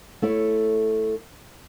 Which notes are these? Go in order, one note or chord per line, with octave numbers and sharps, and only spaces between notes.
A3 E4 C#5